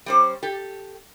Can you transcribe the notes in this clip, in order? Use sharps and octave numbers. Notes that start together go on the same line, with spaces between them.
G3 C#4 C5
G4 A4